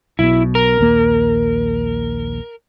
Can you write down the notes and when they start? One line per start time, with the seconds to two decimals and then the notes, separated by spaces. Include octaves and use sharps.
0.19 B1 B2 E4
0.55 A#4
0.79 A#1 D#2 A#3